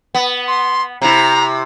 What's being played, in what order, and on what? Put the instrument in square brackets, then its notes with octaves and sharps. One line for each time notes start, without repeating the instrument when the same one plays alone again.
[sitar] B3
[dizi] C6
[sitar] C3 E4 [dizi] A#5